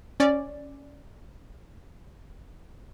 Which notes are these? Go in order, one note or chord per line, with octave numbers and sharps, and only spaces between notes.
C#4 D5